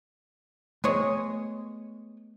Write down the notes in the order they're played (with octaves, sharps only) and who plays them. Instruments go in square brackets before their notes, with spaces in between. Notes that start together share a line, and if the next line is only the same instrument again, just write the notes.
[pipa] G#3 C#5 D#5 [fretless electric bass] A3 B3